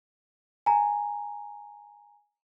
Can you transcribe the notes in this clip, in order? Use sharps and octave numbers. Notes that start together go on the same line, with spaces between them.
G#5 A#5